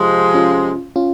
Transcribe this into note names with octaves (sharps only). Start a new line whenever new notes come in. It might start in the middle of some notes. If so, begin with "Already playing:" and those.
Already playing: C3 F3 G#3
C#4 F4
C#4 F4